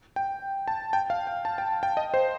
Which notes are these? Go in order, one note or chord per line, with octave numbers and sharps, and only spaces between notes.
G5
A5
G5
F5
G5
A5
G5
G5
D#5
C5